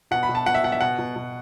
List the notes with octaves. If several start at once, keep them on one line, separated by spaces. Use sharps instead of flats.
B2 F#5
B5
B2
A5
B2 F#5
E5
B2 F#5
E5
B2 F#5
B2
B2